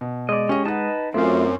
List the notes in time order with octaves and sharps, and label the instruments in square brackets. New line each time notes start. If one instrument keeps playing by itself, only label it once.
[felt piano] B2
[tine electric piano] G#3 [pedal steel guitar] D5 D#5
[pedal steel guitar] C#4 [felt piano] G4 D#5
[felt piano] D#4 F#5 [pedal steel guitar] B4 D#5 A5
[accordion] F#2 [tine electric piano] A3 F4 F5 [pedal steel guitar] C4